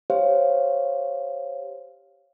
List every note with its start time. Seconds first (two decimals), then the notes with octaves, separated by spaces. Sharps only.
0.10 G4 C5 C#5 F5